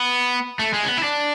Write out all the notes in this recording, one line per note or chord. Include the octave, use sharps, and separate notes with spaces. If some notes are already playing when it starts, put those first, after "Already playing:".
Already playing: B3
A3
G#3
C#4
B3
E4
D4